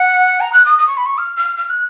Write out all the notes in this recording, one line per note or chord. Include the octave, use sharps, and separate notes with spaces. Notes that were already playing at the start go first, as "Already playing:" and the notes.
Already playing: F#5
A#5
F#6
D#6
D#6
C#6
B5
C#6
F6
F6
F6
F#6